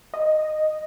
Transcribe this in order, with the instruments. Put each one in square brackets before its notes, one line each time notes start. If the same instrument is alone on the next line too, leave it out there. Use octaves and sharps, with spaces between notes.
[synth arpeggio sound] D#5